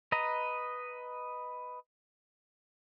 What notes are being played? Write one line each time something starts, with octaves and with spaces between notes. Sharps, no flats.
B4 D#5 A#5